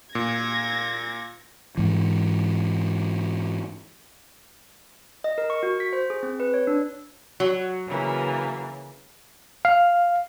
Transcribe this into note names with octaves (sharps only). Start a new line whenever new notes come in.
A#2 G#6 A#6
G#2 E3
D#5
A#4
C#6
F#4
B6
C5
G#4
C4
B4
C#5
D4
F#3
C#3 E3 A#3
F5